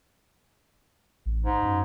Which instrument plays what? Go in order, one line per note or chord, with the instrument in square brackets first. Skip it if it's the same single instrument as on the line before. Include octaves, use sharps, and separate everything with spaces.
[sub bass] A1
[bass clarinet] G#2
[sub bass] F#2